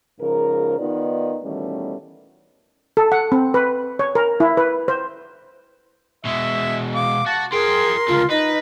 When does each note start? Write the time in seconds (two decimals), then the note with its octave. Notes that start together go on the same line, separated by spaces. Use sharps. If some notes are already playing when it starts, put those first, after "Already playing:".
0.20 G#2 C#3 F3 A#4
0.79 D#3 B3 D#4 F4 B4 D5
1.44 B2 D#3 E3 G3 A3 C#4
2.97 A4
3.12 F#5
3.32 C4
3.54 B4
3.99 C#5
4.15 A#4
4.40 E4
4.57 B4
4.88 C5
6.25 B2 G#3 E5
6.94 F5 D6
7.26 F#4 A5
7.52 F4 G#4 A#4 G5 C6
8.08 C#2 D3 F4
8.30 D#4 B4 D#5